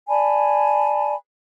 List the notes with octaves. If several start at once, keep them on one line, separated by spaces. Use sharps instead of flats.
D5 G#5 A5 B5